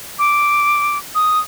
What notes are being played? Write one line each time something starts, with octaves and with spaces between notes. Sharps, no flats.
D6
D#6